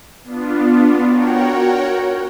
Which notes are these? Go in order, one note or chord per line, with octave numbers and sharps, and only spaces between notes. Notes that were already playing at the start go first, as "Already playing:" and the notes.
B3 D4 F4
F#4 A#4 C#5 F#5 G5